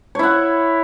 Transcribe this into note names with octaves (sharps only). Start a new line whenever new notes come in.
E4 C#5 F#5